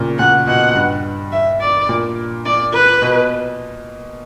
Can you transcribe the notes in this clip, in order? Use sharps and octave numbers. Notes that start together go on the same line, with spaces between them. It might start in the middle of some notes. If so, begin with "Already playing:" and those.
Already playing: A#2 C#3
A#2 F#5
B2 F#5
G2
E5
D5
A#2
D5
B4
B2